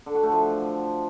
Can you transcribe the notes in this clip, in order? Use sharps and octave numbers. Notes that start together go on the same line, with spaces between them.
D3
F#4
A3
F3